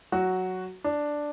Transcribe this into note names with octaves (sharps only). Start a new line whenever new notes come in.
F#3 F#4
D4